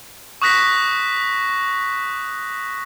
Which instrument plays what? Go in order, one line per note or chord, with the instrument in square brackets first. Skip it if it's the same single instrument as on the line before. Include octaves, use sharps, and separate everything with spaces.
[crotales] C#6 D#6 F#6 A#6 B6